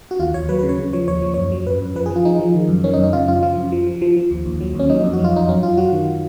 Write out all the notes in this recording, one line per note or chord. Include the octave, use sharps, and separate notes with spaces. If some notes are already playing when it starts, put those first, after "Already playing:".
F#4
D#2 F4
D#2 C#5
F#3 B4
B4
C#3
C#5
C#3
F3 C#5
D#2 C#5
F3
F#2 C#5
F#3
F#2 B4
F#2
F3 B4
G#4
F3
F4
F3 D#4
F3
D#3
F#2
D#3 C#4
D#4
F#2
D#4
C#3 F4
F#2 F4
F3 F4
F#2
F3
F3
F3
F3
D#2
D#2
F#3
D#2 C#4
F#3 D#4
F2
F#4
F#3
F4
F2 D#4
F#2 C#4
F#2 F4
F#3 F#4
D#3